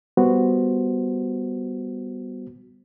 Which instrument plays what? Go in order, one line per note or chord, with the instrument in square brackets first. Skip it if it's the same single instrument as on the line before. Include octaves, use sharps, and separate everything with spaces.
[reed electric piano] G3 B3 F#4 C5